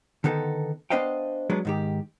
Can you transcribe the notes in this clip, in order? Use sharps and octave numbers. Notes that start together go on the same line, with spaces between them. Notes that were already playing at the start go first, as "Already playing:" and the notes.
D3 D#3 B3 D#4 A4
B3 D4 C5 D#5 F5 G5
F#3 G#3 B3 D4
G#2 D#3 G4